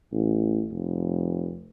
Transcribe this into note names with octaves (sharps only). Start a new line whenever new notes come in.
A1
F1